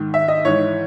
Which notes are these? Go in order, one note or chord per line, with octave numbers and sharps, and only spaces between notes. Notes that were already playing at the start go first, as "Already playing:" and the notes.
Already playing: G#2 D#3
E5
D#5
G#2 E3 C#5